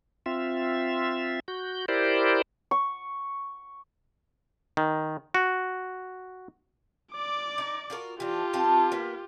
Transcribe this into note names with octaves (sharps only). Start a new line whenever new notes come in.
C4 F4 E5
F#4 G6
E4 G4 A#4 C5 D5
C#6
D#3
F#4
D5 D6
D#4
F4 F#4 A#4
E3 D4 F4 G4
C4 F5 A5
A#3 B3